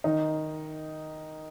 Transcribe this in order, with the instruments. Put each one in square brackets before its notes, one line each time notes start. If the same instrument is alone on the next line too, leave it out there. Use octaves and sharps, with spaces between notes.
[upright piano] D#3 D#4